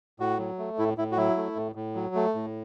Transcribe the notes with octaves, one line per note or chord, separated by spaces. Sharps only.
A2 F#4
F#3
A3
A2 E4
A2 E4
F#4
F#3 E4
A3
A2
A2
F#3
A3
A2